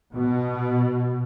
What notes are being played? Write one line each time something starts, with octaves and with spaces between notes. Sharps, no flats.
B2